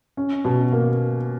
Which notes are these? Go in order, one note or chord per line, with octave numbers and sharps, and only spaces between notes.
C#4
B2
A#3